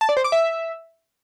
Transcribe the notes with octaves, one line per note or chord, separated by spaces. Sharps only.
A5
D5
C5
D6
E5